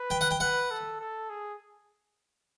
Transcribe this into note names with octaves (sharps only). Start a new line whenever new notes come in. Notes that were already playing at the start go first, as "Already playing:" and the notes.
Already playing: B4
G5
F#5
G5
B4 F#5
A4
A4
G#4